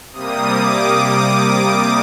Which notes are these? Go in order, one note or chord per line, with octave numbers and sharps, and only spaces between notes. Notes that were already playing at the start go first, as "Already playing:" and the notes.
C3 G3 A#3 D#6
D6
D#6
D6
D6